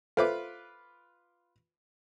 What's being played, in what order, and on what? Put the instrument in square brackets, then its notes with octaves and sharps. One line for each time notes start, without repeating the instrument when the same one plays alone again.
[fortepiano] F4 B4 D6 [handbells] A4 C5 E5